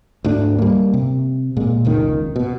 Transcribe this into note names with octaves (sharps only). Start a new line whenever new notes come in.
D2 G#2 D4
G3 A#3
C3
A#2 G#3
F1 C#2 D#3
B2